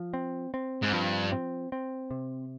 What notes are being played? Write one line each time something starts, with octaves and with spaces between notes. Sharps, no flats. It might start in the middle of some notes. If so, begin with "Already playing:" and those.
Already playing: F3
C4
C4
G#2
G2 F3
C4
C4
C3